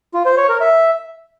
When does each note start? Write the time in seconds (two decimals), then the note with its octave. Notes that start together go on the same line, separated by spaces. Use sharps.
0.14 F4
0.26 C5
0.37 C#5
0.49 A#4
0.61 E5